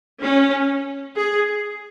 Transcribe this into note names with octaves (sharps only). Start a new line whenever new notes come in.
C#4
G#4